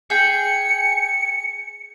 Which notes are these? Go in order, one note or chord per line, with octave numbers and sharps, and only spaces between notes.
G#4 G5 C#7